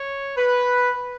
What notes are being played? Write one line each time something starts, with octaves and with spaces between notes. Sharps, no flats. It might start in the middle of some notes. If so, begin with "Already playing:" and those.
Already playing: C#5
B4